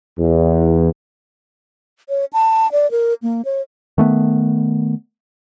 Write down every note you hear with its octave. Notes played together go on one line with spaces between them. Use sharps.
E2
C#5
A5
D5
A#4
A#3
C#5
D#3 A3 B3